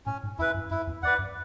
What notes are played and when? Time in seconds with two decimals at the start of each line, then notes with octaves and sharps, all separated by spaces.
0.06 A2 C#4
0.23 G#2
0.39 E2 E4 B4
0.54 F#2
0.71 F#2 E4
0.87 E2
1.03 E2 B4 D5 F#5
1.19 F#2